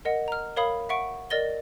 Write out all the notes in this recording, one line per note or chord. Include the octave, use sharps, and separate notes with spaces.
A#4 D#5 F#5
A#5 F6
A#4 C#5 F5 B5 D#6
E5 F#5 C#6 D7
A#4 D5 D#5 A6 A#6 G7